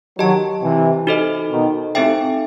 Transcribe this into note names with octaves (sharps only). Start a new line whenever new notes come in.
D#3 F#3 G4 D#5 A5
C3 E3
D#4 F#4 A4 C5 D#5
B2 D#3
A2 C3 C4 D#4 A4 E5 G5